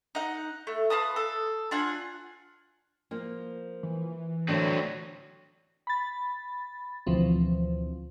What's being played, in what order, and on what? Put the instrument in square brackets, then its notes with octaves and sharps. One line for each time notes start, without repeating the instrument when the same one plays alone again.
[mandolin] D#4 F#5
A3
F4 B4 A5 D#6
A4
D4 F4 F#5 G#5
[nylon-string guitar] F3 A#3
[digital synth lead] E3
[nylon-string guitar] D3 A3 D4 [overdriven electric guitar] F#3 C4
[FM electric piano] B5 A6
D2 B2 E3 F3 C4